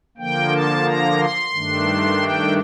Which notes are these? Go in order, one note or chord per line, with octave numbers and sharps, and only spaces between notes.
D3 F3 A#3 G5
A5
A#5
C6
G2 D#3 A3 D4
G5